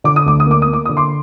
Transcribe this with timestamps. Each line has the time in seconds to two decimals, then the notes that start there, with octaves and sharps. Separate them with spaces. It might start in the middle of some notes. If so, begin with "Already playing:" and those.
0.04 D3 D6
0.16 D#6
0.26 D2 D6
0.40 D#6
0.46 A#3 D6
0.62 D#6
0.68 A#3
0.73 D6
0.85 D3 D#6
0.97 C6 D6